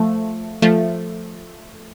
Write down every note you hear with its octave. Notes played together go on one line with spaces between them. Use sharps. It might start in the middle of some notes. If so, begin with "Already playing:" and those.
Already playing: F3 A3
F3 A3